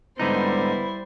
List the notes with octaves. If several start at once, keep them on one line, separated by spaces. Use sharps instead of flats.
G#2 D3 G3 B3 D#4 E4 C5